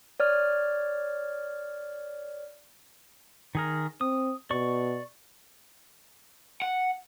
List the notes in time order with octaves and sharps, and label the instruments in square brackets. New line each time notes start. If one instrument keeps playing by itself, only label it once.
[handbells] C#5 D5 F6
[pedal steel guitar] D#3 G#4 A#4
[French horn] C4 [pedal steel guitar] D#6
[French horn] B2 [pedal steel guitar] D5 C#6
[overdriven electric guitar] F#5